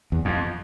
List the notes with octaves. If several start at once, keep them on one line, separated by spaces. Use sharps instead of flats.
E2
F2